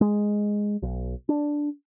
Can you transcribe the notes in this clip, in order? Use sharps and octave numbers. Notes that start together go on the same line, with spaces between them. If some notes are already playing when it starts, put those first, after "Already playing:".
G#3
B1
D4